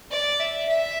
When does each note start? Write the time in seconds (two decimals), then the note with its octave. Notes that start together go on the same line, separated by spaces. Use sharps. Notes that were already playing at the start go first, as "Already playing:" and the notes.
0.11 D5
0.40 E5
0.69 E5